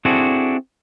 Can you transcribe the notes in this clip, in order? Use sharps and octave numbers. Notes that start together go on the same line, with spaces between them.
C4 D4 E4 F#4 G#4 A4